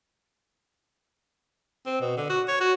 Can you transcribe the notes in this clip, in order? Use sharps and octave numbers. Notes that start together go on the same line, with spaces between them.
C4
B2
D3
F#4
C#5
F#4